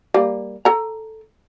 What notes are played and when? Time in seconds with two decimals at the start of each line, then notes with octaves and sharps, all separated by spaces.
0.14 G3 A#3
0.65 A4 A#5